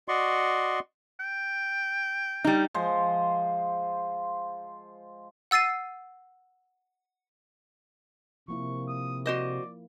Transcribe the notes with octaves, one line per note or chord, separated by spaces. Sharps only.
F#4 D5 D#5 C6 C#6
G5
G3 D#4
F3 G#3 C5
F#5 E6 A6 C7 D#7
C3 F3 A#3 E4 C#6
D#6
F#4 C5 D5 D#5